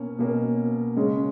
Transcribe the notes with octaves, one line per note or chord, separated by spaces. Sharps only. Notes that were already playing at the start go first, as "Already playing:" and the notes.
Already playing: B2 A#3 C#4
B2 A#3 C#4
C#3 G#3 C#4